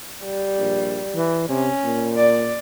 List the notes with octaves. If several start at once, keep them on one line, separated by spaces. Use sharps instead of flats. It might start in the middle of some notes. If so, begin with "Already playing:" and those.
G3
A#1
E3
C3 C#4
A#2
D5